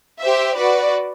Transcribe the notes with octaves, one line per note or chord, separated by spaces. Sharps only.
G4 C5 E5
F#4 B4 D5